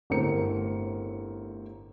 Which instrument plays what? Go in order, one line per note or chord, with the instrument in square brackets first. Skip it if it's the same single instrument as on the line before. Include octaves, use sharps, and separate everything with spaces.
[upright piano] G1 A2 A3 C4 A#4 C#7